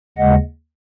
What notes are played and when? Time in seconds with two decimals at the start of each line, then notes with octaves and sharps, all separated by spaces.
0.18 D#2 C#3 G#3 D#5 F#5